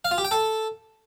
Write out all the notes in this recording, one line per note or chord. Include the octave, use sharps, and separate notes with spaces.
F5
F4
G4
G5
A4